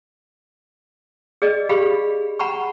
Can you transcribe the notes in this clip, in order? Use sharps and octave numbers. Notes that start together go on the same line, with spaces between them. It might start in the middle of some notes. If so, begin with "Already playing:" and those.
G#4 D5 D#5
G4 G#4 F5 B5
F#5 A#5 B5 C#6